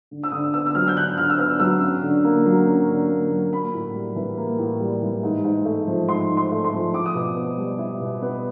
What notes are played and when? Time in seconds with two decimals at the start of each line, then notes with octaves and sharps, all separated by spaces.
0.11 D3
0.24 E6
0.32 D3 D#6
0.54 B3 E6
0.66 E6
0.75 F#3 F6
0.88 G6
0.96 D3 F#6
1.18 D3 F6
1.30 E6
1.39 B3 F6
1.60 F#3 E6
1.81 C#4
2.03 D3
2.24 A#3
2.45 F#3
2.66 C#4
2.88 D3
3.09 A#3
3.31 F#3
3.52 A#3 B5
3.74 A2
3.94 G3
4.16 E3
4.37 A#3
4.58 A2
4.80 G3
5.02 E3
5.23 G#2
5.44 G#2
5.65 A3
5.87 F3
6.08 G#2 C6
6.30 G#2
6.37 C6
6.51 A3
6.65 C6
6.73 F3
6.93 E4 D6
7.06 D#6
7.15 B2 D6
7.37 B3
7.57 G3
7.78 E4
8.00 B2
8.22 B3